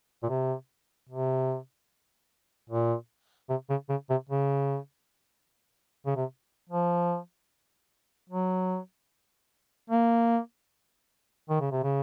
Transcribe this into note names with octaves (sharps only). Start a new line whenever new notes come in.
A#2
C3
C3
A#2
C3
C#3
C#3
C3
C#3
C#3
C3
F3
F#3
A#3
D#3
C#3
C3
C#3